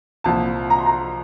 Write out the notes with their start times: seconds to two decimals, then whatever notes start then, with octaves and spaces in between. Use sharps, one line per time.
0.24 C2 A#2 F3 A5
0.70 A#5
0.78 C6
0.86 A#5